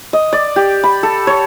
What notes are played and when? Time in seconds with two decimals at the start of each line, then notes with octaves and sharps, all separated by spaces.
0.13 D#5
0.33 D5
0.56 G4
0.84 B5
1.03 A4
1.27 C#5